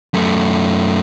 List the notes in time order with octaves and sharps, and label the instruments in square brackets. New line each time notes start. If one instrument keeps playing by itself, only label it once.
[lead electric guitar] F#2 A3